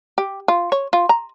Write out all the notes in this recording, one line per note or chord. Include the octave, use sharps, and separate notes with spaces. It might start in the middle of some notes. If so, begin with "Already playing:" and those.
G4
F4
C#5
F4
A#5